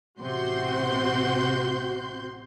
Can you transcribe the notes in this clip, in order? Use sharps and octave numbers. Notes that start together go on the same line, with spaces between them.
A1 C3 F#4 C6 G6